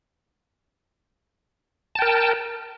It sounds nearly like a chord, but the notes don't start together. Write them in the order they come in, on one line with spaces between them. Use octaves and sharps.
A5 G5 A#4